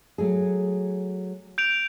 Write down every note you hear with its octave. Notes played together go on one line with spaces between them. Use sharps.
F#3 A3 G#4
G6 D7 F7